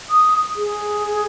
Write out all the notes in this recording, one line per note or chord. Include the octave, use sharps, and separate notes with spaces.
D#6
G#4